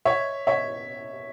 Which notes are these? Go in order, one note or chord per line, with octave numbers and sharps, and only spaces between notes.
C#5 E5
C#5 E5